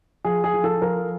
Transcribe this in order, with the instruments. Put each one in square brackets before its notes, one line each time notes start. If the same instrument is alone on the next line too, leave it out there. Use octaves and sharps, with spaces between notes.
[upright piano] F3 G#4
G#4
F3
A4
F3 A#4